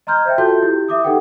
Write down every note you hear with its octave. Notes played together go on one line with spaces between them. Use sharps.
D#5 A#5 C6 F6 G6 G#6
C5 E5 G5
F4 F#4 A4 A5 C6 G6
E4 G4
E5 D6 D#6
D#4 G4 A4 B4 F#5 G5